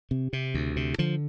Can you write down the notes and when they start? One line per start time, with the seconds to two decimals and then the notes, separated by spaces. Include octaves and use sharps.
0.11 C3
0.33 C3
0.54 D2
0.76 C3
0.98 D3 F3